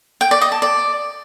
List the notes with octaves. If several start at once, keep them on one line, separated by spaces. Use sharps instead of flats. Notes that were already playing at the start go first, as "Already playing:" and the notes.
G5
D5
D#5
A5
D5